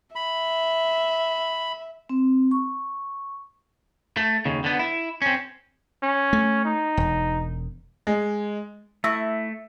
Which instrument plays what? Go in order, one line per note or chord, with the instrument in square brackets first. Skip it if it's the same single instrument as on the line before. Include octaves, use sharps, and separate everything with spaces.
[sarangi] E5 [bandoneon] B5
[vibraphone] C4
C#6
[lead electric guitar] A3
D#2 C#3
D3 B3
E4
C4 C#4
[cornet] C#4
[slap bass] A3
[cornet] D#4
[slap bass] E1
[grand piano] G#3
[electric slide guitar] A3 [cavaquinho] E4 C#6 [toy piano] E5 E6